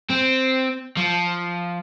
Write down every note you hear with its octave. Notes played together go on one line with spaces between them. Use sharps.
C4
F3